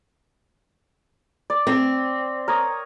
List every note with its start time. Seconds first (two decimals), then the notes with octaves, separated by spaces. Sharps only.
1.50 D5
1.67 C4
2.48 A#4 C#5 D#6